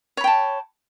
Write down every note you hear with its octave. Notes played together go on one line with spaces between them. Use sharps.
C#5 G5 A5 B5